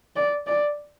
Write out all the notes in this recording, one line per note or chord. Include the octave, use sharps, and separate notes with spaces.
D5
D5